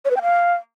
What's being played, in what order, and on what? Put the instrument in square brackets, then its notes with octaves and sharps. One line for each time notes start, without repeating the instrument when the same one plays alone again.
[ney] C#5
B4
G5
F5